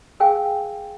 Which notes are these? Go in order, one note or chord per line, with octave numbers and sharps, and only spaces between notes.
G#4 A#4 F5 G5 G#5